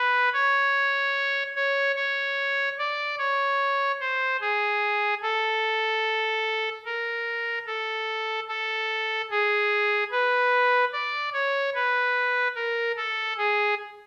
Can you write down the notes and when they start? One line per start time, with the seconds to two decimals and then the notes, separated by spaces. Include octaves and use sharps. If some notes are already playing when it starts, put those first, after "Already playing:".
Already playing: B4
0.33 C#5
1.56 C#5
1.96 C#5
2.78 D5
3.18 C#5
4.00 C5
4.41 G#4
5.22 A4
6.85 A#4
7.66 A4
8.48 A4
9.30 G#4
10.11 B4
10.93 D5
11.33 C#5
11.74 B4
12.55 A#4
12.96 A4
13.37 G#4